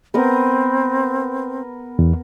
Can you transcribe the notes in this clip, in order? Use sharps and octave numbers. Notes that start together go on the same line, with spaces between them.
B3 C4 A#4 D#6
E2